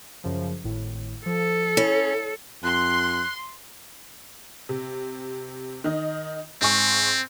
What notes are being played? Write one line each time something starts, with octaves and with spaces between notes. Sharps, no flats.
F#2 C#3 F3
G#1 A2
F3 A4
C#4 E4
F2 C6 F#6
C3
D#3 D#5
G#2 C4 G#5 C#6